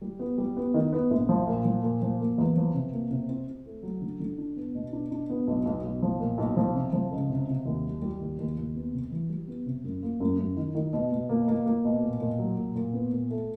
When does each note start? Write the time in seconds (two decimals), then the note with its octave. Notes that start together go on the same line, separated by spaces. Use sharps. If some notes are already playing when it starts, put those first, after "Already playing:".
0.01 G3
0.19 B3
0.38 G3
0.56 B3
0.74 D#3
0.92 B3
1.11 A#1
1.29 F3
1.47 A#2
1.65 F3
1.83 A#2
2.02 F3
2.20 A#3
2.38 E2
2.56 F3
2.74 C3
2.93 A#3
3.11 C3
3.29 C4
3.47 C4
3.66 A3
3.83 F#3
4.01 D3
4.20 D3
4.38 D4
4.56 B3
4.75 B2
4.92 D4
5.11 D4
5.30 B3
5.47 B1
5.65 B1
5.83 B1
6.02 F3
6.20 A#2
6.38 B1
6.56 F3
6.75 C3
6.93 F3
7.11 C#2
7.29 C3
7.48 C3
7.65 D#2
7.84 G3
8.02 G3
8.20 D#2
8.39 D#2
8.57 D#2
8.75 B3
8.93 C3
9.11 E3
9.29 G3
9.48 B3
9.66 C3
9.84 F#2
10.03 A#3
10.20 F#2
10.38 F#2
10.57 D#3
10.75 D#3
10.93 B2
11.12 B2
11.29 A#3
11.48 A#3
11.66 A#3
11.85 B2
12.03 A#2
12.20 A#2
12.39 F#3
12.58 A#2
12.75 A#2
12.93 B3
13.12 A#2
13.30 A3